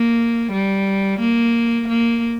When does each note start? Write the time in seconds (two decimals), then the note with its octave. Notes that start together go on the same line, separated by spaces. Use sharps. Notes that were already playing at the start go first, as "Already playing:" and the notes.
Already playing: A#3
0.53 G3
1.20 A#3
1.89 A#3